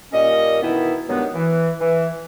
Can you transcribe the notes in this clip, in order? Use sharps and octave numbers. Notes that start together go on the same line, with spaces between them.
A#2 G3 A#3 C#4 D#5
B2 D#3 E3 B3 E4
G2 D#3 F#3 G#3 B3
E3
E3